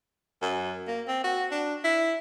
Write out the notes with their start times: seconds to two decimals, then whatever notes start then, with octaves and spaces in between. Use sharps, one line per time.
0.42 F#2
0.87 A#3
1.08 C4
1.24 F#4
1.51 D4
1.84 E4